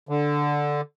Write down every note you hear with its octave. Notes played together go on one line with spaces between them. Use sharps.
D3